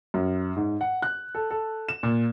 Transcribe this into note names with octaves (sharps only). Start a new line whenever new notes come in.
F#2
G#2
F#5
F#6
A4
A4
E7
A#2